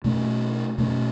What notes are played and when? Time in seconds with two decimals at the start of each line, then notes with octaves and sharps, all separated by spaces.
0.04 B2 A3 C#4
0.78 B2 A3 C#4